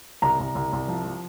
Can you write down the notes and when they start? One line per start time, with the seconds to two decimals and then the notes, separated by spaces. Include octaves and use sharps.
0.22 C2 A#5
0.40 C2
0.55 C2
0.73 C2
0.88 F3
1.05 F3